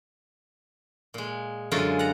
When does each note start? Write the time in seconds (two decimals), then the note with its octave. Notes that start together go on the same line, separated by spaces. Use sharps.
1.14 A#2 G#3
1.72 F#2 D3 G#3 F4
1.99 F#5 A#5